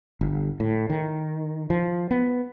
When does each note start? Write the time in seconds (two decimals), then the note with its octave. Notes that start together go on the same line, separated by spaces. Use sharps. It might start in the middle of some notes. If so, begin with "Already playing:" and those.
0.21 G1
0.60 A2
0.90 D#3
1.70 F3
2.11 B3